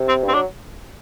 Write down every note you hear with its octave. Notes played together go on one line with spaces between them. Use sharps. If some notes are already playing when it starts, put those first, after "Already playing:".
Already playing: C3
C4
G2 C4
F#3 D4